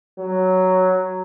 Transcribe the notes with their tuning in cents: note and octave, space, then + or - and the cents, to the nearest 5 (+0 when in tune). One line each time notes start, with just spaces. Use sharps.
F#3 +5